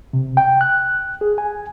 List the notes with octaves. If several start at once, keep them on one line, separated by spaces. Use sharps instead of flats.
C3
G5
F#6
G#4
G#5